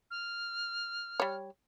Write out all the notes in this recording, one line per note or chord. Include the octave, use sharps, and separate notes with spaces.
F6
G3 C#5